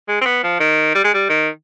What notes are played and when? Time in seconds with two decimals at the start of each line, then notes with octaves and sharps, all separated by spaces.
0.08 G#3
0.21 C4
0.26 B3
0.43 F3
0.60 D#3
0.95 G3
1.04 G#3
1.14 G3
1.30 D#3